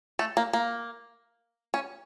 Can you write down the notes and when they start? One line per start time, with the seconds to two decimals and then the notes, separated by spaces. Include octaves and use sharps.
0.19 A3
0.37 A#3
0.53 A#3
1.74 C#4